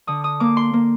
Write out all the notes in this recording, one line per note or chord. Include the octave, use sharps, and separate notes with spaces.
D3 D#6
D#6
A#3 D6
C6
A#3